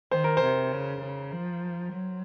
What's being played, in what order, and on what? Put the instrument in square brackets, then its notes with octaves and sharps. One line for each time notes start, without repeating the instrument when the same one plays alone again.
[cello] D#3 [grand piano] C5
[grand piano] A#4
C5
[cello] C3
C#3
C#3
F3
F#3